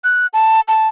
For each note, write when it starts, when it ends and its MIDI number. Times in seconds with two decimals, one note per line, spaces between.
0.04 0.27 90
0.33 0.61 81
0.68 0.88 81